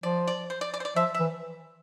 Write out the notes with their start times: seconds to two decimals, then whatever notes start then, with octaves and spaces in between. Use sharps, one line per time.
0.03 F3 D5
0.28 D5
0.50 C5
0.61 D5
0.74 D5
0.80 C5
0.85 D5
0.96 F3 E5
1.15 E5
1.20 E3